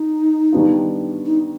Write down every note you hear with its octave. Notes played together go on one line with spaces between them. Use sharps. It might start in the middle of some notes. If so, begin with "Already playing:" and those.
Already playing: D#4
D#3 G3 B3 D4 F4
D#4